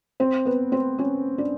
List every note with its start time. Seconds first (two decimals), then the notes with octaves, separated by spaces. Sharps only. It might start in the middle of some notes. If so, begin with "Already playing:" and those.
0.20 C4 C5
0.45 B3 B4
0.72 C4 C5
0.98 C#4 C#5
1.38 D4 D5